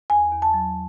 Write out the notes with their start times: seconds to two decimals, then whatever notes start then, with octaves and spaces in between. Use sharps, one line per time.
0.10 E2 G#5
0.31 E2
0.42 A5
0.54 F#3